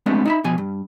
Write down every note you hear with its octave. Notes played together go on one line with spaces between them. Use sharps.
G#3 A3 B3 C4 D4 G4
D#4 E5 B5
B2 F3 G#5
G2